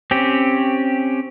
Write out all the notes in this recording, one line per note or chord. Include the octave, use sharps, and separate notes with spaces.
C4 C#4 G4